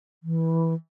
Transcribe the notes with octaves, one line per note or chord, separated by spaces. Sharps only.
E3